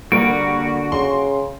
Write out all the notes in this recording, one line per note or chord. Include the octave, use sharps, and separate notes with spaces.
D3 G3 A#3 F#4 D7
C#3 C6